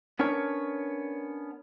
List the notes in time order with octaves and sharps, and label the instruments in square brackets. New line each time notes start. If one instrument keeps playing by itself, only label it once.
[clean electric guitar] B3 C#4 D4 A#4 C#5